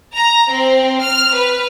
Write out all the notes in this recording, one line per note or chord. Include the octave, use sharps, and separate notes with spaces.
A#5
C4
F6
B4